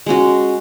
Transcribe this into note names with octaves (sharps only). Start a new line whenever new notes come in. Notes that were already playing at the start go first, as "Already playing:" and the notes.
G#3 C#4 F#4